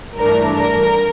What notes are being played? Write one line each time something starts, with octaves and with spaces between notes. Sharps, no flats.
G2 E3 A3 D4 A#4
A#4